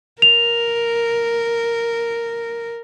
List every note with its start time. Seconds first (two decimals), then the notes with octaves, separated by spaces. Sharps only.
0.22 A#4 F7